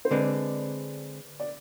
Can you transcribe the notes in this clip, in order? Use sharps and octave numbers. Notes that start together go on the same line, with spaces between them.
C5
D3 G#3 C4 B4 D5
D5